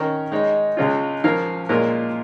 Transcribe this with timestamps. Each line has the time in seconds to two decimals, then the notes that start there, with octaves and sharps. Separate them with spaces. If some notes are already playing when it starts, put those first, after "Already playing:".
Already playing: D#3 C#4 A#4 C#5
0.32 G#3 D#4 C#5
0.77 C#2 C#3 G#3 C#4 F4
1.24 F3 C#4 A#4 C#5 F5
1.69 A#2 G#3 F4 A#4 C#5